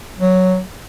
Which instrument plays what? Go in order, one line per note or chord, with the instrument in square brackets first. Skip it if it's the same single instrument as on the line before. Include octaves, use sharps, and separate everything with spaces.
[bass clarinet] F#3